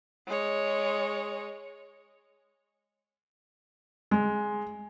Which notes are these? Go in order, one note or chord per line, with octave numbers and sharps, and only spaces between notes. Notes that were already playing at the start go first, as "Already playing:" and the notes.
G#3 C#5
G#3